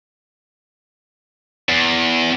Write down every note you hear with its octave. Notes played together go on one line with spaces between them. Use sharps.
E2